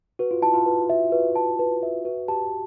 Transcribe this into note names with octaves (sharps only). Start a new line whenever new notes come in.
F#4 B4
F4
E4 A5
F4
B4
E5
F#4 B4
A5
B4
E5
F#4 B4
G4 A5